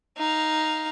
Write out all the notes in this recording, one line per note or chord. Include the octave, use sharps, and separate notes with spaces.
D#4 F5